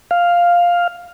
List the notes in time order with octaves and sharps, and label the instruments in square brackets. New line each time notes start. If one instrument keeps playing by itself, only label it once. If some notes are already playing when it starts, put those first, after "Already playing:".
[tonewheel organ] F5